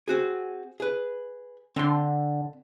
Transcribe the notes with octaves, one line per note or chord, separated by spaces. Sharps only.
C4 F#4 G#4
G#4 B4
D3 C4 D4 C6